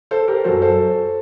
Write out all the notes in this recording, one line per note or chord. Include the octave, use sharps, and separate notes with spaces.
A4 C5
G4 A#4
F#2 F#3 A4 C5
A4 C5